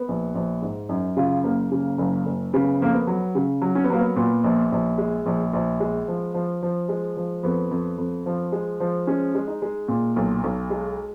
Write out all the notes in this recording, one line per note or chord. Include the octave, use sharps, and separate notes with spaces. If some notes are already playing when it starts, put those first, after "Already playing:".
Already playing: B3
A#1
A#1
G#2
F#2 D#4
C#3 F4
F#1 A#3
C#3
F#1
F#1
C#3 B3
F2 A#3
B3
F#3
C#3
F#3
C#4
B3
F#3 A#3
B3
A#2 B3
A#1
A#1
G#3
A#1
A#1
G#3
F3
F3
F3
G#3
F3
F2 B3
F2
F2
F3
G#3
F3
G#3 C#4
G#3
D#4
G#3
A#2
B1
B1
G#3